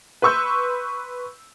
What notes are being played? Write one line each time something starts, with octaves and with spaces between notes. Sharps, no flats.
B4 C6 C#6 E6 G6